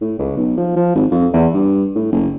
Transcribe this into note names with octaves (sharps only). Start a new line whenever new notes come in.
A2
C#2
B1
F3
F3
G#1
F2
E2
G2
A2
F#1